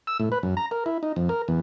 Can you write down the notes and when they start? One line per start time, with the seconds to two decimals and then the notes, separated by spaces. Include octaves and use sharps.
0.07 E6
0.20 A2
0.32 B4
0.43 F#2
0.57 A#5
0.71 A#4
0.86 E4
1.03 D#4
1.16 F2
1.29 A#4
1.48 E2